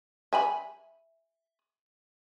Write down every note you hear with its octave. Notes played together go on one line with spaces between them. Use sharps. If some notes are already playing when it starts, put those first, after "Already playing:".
E5 G#5 B5